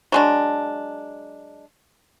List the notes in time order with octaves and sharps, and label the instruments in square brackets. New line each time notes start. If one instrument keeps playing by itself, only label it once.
[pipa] F#3 G#3 D4